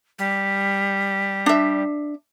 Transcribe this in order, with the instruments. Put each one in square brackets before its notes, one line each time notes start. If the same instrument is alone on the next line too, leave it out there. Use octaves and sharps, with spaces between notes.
[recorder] G3
[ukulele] D4 E5